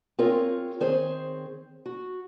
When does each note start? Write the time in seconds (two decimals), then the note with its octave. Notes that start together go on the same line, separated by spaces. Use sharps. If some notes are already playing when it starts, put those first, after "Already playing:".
0.18 C4 F4 G#4 A#4 C#5
0.80 D#3 C4 G#4 C5 C#5
1.86 F#4